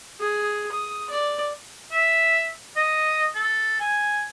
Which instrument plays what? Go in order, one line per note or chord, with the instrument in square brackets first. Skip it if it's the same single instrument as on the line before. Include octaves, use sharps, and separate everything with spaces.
[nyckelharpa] G#4
D#6
D5
[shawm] E5
D#5
A4
G#5